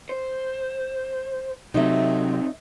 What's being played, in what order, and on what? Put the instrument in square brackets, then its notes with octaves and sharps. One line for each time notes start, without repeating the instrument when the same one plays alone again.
[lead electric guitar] C5
[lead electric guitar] E2 C4 [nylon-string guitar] C3 F#3 A3 [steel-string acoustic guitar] D#4 E5